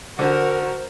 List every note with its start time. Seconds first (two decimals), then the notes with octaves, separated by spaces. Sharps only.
0.19 D3 F#4 A#4 C5